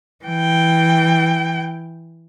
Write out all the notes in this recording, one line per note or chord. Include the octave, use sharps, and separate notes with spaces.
E3 G5